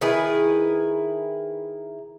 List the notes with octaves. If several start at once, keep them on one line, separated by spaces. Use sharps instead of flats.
D#3 E4 G#4 B4